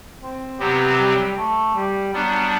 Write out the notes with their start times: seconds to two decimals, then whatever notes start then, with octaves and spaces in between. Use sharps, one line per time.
0.21 C4
0.60 C3 F#3 B3 C4 G4
0.98 G3
1.37 A3
1.75 G3
2.13 F#3 G3 B3 D4